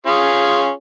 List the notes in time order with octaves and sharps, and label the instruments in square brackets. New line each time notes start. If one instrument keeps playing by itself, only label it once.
[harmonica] C#4 F4 G#4